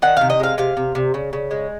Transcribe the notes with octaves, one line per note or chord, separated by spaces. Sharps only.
D#3 F#5
C3 F5
D#5
G#3 F5
C3 F5
C3
C3
C#3
C#3
G#3